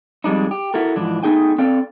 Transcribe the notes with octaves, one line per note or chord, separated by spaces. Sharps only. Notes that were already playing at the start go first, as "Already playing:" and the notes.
F2 G3 G#3 D4 D#4
G4
E4 F#4 A4 A#4
G#2 E3 F3 D4
A3 B3 D#4 G#4 G5 G#5
C4 D4 A4 D5 F5 G5